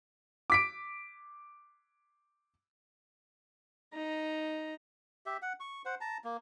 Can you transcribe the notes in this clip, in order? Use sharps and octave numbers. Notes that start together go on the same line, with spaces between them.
D6 B6 D7
D#4 A#5
G4 E5
F#5
C#6
C5 F#5
A5 A#5
A#3